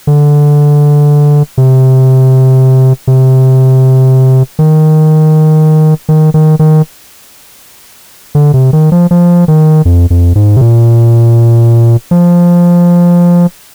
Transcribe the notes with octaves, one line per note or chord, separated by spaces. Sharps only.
D3
C3
C3
D#3
D#3
D#3
D#3
D3
C3
D#3
F3
F3
D#3
F2
F2
G#2
C3
A#2
F3